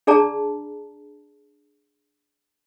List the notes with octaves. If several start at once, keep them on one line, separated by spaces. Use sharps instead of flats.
D4 G#4 D5 A5 A#5